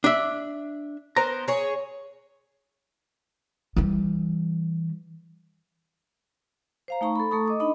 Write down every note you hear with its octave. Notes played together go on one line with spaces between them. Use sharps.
D4 E5
B3 A#4 C5 A#5
G#4 C#5
E3 G3
C5 F5 A#5
A3 D#4 A#5 C#6
A4 B5
A3 A4 A#5 C#6 D#6
D#5 D6 D#6
D4 D#4 D#5 B5 D6